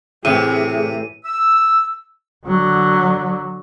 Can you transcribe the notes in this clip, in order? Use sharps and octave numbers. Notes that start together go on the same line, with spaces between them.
A2 C3 E3 G#4 D#7
E6
D3 F#3